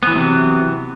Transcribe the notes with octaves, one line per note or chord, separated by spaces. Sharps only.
C3 E3 F#3 B3